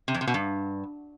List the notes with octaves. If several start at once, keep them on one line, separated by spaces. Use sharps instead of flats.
C3
F2
C3
B2
G2